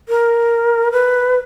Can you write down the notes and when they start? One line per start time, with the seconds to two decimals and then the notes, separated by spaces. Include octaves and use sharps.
0.09 A#4
0.92 B4